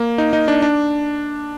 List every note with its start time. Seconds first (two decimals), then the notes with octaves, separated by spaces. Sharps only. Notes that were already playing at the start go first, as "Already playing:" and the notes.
Already playing: A#3
0.18 D#4
0.33 D#4
0.48 D4
0.62 D4